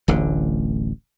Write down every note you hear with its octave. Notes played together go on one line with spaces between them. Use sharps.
D1 A1 D3